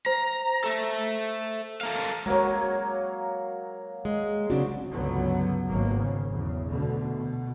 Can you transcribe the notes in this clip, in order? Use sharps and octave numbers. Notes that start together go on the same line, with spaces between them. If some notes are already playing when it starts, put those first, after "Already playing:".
C5 A#5
A4 E5
A4 A#4 F5
F#3 G#3 A#3 F#4 C#5
G#3
C#3 C4 D4 F#4
C#2 G2 D3 F#3 B3
G#1 F#3 A#3 B3
C#3
B1 E2 C#3
D2 B2 D3
B2